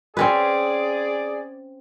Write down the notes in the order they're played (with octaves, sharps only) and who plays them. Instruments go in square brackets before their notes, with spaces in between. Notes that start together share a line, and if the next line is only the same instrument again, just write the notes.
[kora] C4 C#4 B4 [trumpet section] G#4 D5